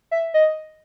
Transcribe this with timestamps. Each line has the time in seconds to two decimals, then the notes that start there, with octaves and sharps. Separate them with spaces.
0.11 E5
0.34 D#5